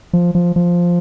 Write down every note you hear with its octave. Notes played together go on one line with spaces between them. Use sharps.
F3
F3
F3